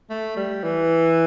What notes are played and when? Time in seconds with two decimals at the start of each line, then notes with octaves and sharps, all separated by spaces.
0.10 A3
0.37 G3
0.64 E3